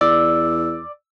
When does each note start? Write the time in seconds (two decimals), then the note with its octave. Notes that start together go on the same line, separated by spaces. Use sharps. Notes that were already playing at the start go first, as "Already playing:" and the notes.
0.01 E2 D5 E6